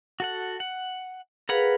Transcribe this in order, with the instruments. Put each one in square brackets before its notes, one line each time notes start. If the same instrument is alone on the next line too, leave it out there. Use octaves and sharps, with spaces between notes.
[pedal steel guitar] F#4 A4 F#5
F#5
[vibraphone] G#4 B4 F5 [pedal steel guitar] A#4 F#5 B5